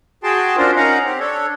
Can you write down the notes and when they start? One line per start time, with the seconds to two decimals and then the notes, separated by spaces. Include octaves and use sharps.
0.24 F#4 G#4 G5 A5 C6
0.57 C#4 D4 F4 A#4 C5
0.76 C#4 D#4 A#4 F5 F#5 A#5
1.04 C4 G4
1.20 D4 A4 C#5